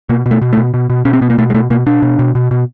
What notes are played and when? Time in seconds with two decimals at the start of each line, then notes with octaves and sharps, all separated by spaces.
0.09 B2 A#3
0.26 B2
0.31 A3
0.42 B2
0.53 A3
0.57 B2
0.74 B2
0.90 B2
1.05 B2 C#4
1.13 C4
1.21 B2 B3
1.30 A#3
1.38 B2 A3
1.50 G#3
1.54 B2 A3
1.70 B2 A#3
1.86 B2 D4
2.02 B2
2.19 B2
2.35 B2
2.51 B2